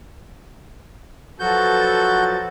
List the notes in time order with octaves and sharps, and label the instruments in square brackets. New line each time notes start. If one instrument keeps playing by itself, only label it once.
[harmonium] F3 F#3 [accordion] F#4 G6 [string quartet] A4 B4 A6